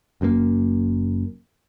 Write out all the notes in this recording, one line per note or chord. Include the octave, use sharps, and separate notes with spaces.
F#1 F#2 B2 A#3